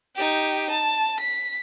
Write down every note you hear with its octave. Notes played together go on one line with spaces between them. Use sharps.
D#4 G4
A5
B6